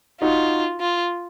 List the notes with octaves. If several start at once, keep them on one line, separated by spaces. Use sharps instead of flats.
D#4 F4 F#4
F4